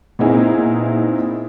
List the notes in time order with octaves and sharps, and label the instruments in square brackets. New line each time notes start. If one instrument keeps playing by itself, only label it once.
[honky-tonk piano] A#2 B3 C4 D#4 E4 G#4